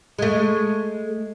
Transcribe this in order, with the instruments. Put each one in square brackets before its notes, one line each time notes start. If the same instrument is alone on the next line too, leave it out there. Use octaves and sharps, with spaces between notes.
[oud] G#3 A3